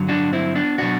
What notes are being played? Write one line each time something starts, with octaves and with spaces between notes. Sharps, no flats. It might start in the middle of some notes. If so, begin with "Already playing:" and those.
Already playing: G2 D3 F#3
D4 F#4
C4 E4
B3 D4
B2 F#3 D4 F#4